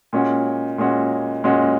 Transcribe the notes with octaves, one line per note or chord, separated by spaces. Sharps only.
A#2 G#3 C#4 F#4
A#2 G#3 C#4 F#4
A#2 G#3 C#4 F#4